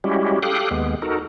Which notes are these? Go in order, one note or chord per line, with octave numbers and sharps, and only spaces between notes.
G3 G#3 C#4 E4 F#4 G4
G4 A4 F5 G5 D#6 F#6
D#2 G#3 B3
D#4 F#4 A4 A#4